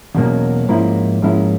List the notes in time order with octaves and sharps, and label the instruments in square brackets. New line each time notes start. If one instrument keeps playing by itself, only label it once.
[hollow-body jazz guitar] E2 B2 F#3 A#3 C#4
G#2 F3 A#3 C#4 E4
G#2 F3 A#3 C#4 E4